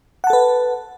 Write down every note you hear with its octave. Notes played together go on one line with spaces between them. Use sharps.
A4 B4 F#5 A5